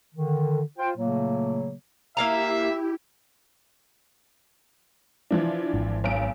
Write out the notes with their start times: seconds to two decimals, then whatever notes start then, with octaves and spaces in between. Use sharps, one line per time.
0.15 D3 D#3
0.79 F4 C5 G5
0.96 A#2 C#3 F#3 A3 A#3
2.17 A#3 E4 G4 E5 F5 A#5
5.31 E3 F3 D4
5.74 G#1
6.04 B1 D7